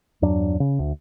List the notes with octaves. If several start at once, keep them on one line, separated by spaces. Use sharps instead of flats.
E2 G2 F#3 D4
C#3
D2